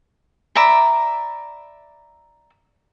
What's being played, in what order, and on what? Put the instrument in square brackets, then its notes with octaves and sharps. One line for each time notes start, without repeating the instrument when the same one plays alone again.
[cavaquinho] D5 E5 A#5 B5